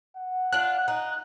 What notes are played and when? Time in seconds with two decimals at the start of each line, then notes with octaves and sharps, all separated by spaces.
0.16 F#5
0.52 D4 F4 F#6
0.88 D#4